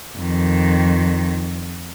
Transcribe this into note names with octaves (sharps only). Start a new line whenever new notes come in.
F2 D#3